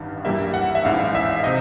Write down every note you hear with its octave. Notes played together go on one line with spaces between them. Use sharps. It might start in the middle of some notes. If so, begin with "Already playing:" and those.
Already playing: A1 G2 D#3
G2 E3 G3 A#3 E5
F#5
E5
A1 G#2 E3 F5
E5
C3 D#5